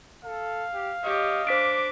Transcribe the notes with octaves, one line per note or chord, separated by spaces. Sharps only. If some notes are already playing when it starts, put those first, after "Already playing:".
A4 F5
G4
G4 C#5 D#5
D4 C5 D6 B6 D7